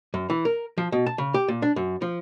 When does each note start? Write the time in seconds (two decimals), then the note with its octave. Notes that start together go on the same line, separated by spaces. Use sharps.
0.14 F#2
0.30 E3
0.45 A#4
0.78 F3
0.92 B2
1.06 A5
1.18 C#3
1.34 G4
1.48 A#2
1.62 D4
1.76 F#2
2.02 F3